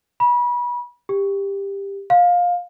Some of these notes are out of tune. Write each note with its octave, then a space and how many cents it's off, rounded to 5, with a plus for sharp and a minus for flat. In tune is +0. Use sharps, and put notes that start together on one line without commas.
B5 -30
G4 +15
F5 +20